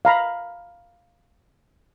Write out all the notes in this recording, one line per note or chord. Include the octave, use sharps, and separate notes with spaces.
F5 A#5 B5